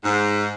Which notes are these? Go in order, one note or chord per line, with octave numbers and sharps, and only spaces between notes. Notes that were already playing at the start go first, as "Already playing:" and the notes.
G#2